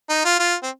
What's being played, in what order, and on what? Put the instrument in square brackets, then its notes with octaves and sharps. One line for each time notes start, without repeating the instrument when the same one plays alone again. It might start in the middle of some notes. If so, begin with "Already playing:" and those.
[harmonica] D#4
F4
F4
C4